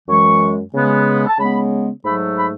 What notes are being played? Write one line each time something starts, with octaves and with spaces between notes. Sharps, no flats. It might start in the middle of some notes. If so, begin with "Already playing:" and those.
F#2 E3 G#3 C#6
C#3 G#3 B3
A5
C#3 G#3 B3 B5
G#2 F#3 A3 B5
B5